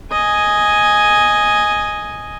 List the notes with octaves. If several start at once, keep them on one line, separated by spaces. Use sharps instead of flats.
D#5 G#5